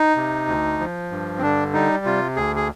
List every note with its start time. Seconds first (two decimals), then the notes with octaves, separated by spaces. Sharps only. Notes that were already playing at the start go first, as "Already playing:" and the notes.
Already playing: D#4
0.17 C3
0.48 D2
0.79 F3
1.11 G2
1.38 C4
1.42 D3 D4
1.74 G3 D#4
2.05 C3 F4
2.36 D2 G#4
2.56 G#4